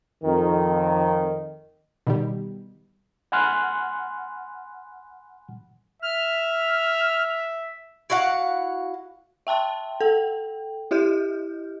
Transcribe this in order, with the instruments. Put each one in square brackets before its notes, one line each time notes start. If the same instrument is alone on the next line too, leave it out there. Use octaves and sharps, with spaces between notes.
[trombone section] F2 D#3
[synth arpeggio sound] B2 D#3 G3
[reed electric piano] F#5 G#5 B5 C6 F6 F#6
[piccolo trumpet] E5 [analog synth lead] F6
[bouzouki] E4 F#4 F5 F#5
[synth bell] E5 G5 A5 C6
A4 G5
E4 G4 D#5 F6 G6